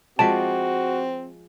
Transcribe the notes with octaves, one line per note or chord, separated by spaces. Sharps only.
F3 G#3 C4 F#4 D5 A5 B6